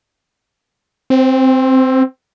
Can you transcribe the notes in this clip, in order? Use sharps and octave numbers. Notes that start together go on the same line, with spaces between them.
C4